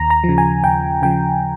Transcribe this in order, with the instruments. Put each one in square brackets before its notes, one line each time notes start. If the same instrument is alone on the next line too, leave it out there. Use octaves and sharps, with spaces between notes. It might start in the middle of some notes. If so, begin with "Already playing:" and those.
Already playing: [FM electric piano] D#2 A#5
A#5
C#3 F3
G#5
D#2 G5
C#3 F3 G5